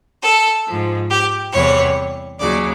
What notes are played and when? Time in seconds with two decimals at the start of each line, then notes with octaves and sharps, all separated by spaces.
0.23 A4
0.67 G#2 F3
1.10 G4
1.53 E2 C3 E3 G3 C#5
2.39 D#2 C#3 F#3 D5